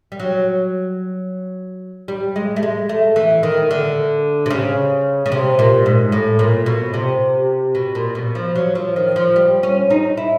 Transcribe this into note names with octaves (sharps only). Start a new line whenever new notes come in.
G3
F#3
G3
G#3
A3
G#3
A3
E3
D#3
D3
C3
C#3
C#3
C3
A#2
G#2
A2
A#2
B2
C3
B2
A#2
B2
F3
F#3
F3
D#3
F3
G3
C#4
D#4
E4